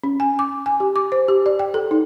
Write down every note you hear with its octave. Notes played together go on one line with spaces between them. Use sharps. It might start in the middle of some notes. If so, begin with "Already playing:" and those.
C#4
G#5
D6
G#5
G4
D6
C5
G4
D5
G5
A4
D#4